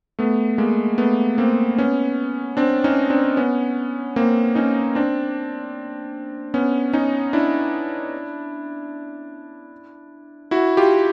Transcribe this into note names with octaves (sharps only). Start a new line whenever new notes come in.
A3 B3
G#3 A#3
A3 B3
A#3 C4
B3 C#4
C4 D4
C#4 D#4
C4 D4
B3 C#4
A#3 C4
C#4 D#4
C4 D4
B3 C#4
C#4 D#4
D4 E4
E4 F#4
F4 G4